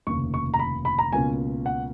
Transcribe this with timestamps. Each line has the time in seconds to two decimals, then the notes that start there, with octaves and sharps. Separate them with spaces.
0.07 F1 D#2 C#3 C#6
0.34 C#6
0.54 A#5
0.59 B5
0.85 B5
0.99 A#5
1.12 C#2 B2 A#3 C#4 G#5
1.66 F#5